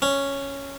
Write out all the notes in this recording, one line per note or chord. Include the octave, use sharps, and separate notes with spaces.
C#4